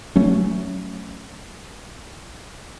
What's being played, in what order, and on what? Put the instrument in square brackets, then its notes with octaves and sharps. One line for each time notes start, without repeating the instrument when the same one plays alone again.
[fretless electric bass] F#3 A3 C#4